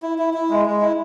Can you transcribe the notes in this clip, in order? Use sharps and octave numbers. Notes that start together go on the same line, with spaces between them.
E4
E4
E4
G#3
G#3
E4